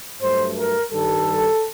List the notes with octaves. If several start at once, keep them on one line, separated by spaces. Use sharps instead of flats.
G2 F#3 A3 C5
A#4
G2 D#3 G3 A4